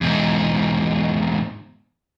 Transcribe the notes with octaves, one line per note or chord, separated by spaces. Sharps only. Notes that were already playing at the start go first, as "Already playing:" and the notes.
E2 G#2